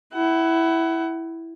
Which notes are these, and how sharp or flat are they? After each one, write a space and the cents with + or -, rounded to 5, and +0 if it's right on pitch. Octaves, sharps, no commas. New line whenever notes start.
E4 +0 F#5 +30